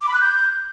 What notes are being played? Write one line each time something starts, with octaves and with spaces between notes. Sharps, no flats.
D6
B5
F#6
G6